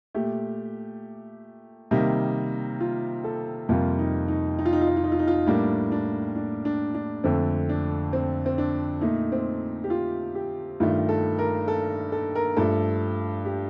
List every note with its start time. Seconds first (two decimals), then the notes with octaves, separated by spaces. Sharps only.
0.14 A#2 A3 G4
1.91 C3 D#3 G3 A#3 D#4
2.80 F4
3.24 A4
3.69 F2 C3 G3 A#3 F4
3.99 D#4
4.28 D#4
4.59 D#4
4.66 F4
4.73 D#4
4.81 F4
4.88 D#4
4.97 F4
5.04 D#4
5.12 F4
5.19 D#4
5.28 F4
5.34 D#4
5.47 A2 G3 A#3 D4
5.92 D4
6.36 D4
6.65 D4
6.95 D4
7.24 F2 D3 A3 C4
7.69 D4
8.13 C4
8.46 C4
8.58 D4
9.01 A#2 A3 D#4
9.32 C4
9.84 G4
9.90 F4
10.35 G4
10.80 G2 D#3 A3 F4
11.09 A4
11.39 A#4
11.68 A4
12.12 A4
12.35 A#4
12.57 G2 F3 A3 A4
13.45 G4